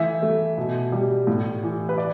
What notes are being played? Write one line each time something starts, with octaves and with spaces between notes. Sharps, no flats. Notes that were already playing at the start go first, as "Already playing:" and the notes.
Already playing: E3 A3 E5
A3
B2
G3
A2
E3
B4
D5